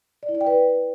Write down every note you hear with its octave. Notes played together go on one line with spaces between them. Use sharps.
D5
E4
D5
G5
B4